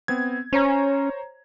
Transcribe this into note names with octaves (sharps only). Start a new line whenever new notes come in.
B3 C4 G#6
C#4 C5 C#5 A#5